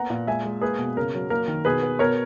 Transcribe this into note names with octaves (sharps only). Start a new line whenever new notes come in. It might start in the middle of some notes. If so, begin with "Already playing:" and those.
Already playing: A#3 B3 F#5 A#5
A#2
G#3 E5 G#5
G#3
A#3 G#4 B4
B2
C#3 A#4
F#3
A#3 A#4
D#3
B2 G#4 B4
B3
B2 A#4 C#5